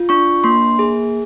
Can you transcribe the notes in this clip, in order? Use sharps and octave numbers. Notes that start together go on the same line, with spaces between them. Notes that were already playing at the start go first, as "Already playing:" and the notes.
Already playing: F4
D4 C#6
A#3 C6
G#4